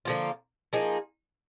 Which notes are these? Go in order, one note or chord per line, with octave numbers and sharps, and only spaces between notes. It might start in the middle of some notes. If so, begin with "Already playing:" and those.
D3 F3 A#3 F4
F3 A#3 D#4 G#4